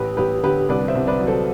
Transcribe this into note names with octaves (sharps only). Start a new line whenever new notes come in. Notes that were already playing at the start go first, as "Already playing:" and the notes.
Already playing: A1 G4 B4
A1 G4 B4
D3 G4 B4
C2 B4 D5
C5 E5
C2
B4 D5
F#3
A4 C5